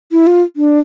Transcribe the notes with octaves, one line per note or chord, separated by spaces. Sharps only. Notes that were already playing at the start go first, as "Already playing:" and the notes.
E4
F4
D4